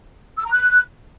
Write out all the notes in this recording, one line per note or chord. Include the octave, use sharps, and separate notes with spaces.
E6
A#5
F#6